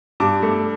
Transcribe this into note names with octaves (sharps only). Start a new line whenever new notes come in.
G2 A5 D6
A3